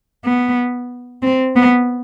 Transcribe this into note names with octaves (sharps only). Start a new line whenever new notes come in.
B3
C4
B3